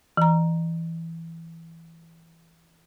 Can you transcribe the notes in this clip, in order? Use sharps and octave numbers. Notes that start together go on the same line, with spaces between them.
E3 A#5